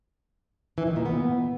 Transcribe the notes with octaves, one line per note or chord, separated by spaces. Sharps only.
E3
D#3
A#2
B3